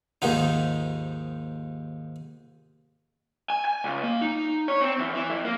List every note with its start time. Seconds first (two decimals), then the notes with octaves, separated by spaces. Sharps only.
0.22 D#2 G#2 F3 D#4
3.50 G#5
3.65 G#5
3.84 C#2
4.03 A#3
4.21 D#4
4.68 C#5
4.81 C4
4.99 E2
5.15 E3
5.30 F2
5.45 A#3